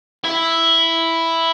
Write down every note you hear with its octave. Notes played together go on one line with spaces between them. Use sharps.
E4